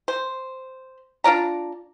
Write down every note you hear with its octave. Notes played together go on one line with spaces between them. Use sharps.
C5
D4 F4 D5 A#5